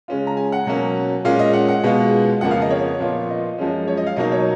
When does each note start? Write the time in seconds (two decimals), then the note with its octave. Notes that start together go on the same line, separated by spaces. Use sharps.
0.08 C#3 G#3 C#4 F4
0.27 A#5
0.37 G#5
0.52 F#5
0.66 B2 F#3 A#3 C#4
1.25 A#2 G#3 C#4 F4 F5
1.39 D#5
1.53 F#5
1.68 F#5
1.83 B2 G#3 B3 F4
2.41 F2 C#3 F3 A#3 F#5
2.51 F5
2.62 D#5
2.70 C#5
2.99 A#2 F3 B3 F4
3.30 D#5
3.58 F#2 F3 G#3 C#4
3.87 C#5
3.97 D#5
4.07 F5
4.16 B2 F#3 A#3 D#4 D#5
4.32 C#5